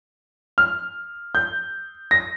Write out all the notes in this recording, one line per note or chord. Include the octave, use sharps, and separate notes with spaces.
F6
G6
A#6